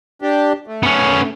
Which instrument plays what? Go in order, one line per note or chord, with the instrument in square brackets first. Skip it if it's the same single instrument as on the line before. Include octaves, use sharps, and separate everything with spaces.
[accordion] D4 G4
A3
[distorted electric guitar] B3 C#4